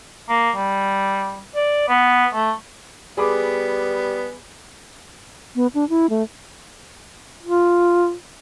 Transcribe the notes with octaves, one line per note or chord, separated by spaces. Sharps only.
A#3
G3
D5
B3
A3
G3 B3 G#4 B5 D6
B3
D4
E4
A3
F4